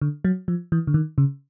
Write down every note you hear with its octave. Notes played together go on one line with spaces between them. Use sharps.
D3
F#3
F3
E3
D3
D#3
C#3